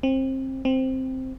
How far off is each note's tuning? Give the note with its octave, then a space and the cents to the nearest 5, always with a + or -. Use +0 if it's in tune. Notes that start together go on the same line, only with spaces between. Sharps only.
C4 +25
C4 +0